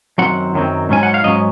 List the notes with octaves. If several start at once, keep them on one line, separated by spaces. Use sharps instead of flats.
F#2 D#3 F#3 C4 F#5
F#2 D#3 F#3 C4
G#2 F#3 C#4 G#5
F#5
F5
G#2 F#3 C#4 D#5